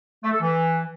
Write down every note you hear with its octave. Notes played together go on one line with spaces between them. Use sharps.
A3
A4
E3